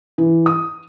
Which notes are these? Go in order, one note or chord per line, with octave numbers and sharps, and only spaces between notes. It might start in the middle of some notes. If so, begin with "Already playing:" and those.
E3
D#6